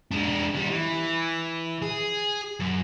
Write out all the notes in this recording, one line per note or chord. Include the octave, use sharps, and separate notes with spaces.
G#3 D4
D#2 G3
E3
G#4
F#2